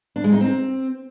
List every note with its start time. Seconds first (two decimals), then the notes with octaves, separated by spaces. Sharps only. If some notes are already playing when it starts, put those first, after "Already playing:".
0.16 D4
0.24 G#3
0.32 D#4
0.41 C4